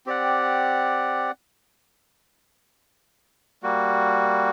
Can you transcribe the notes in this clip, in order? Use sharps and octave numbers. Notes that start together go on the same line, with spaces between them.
C4 G4 D5 F#5
G3 A#3 F#4